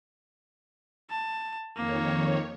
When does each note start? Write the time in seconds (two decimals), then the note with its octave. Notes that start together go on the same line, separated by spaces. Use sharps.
1.10 A5
1.76 F2 D#3 A#3 C#5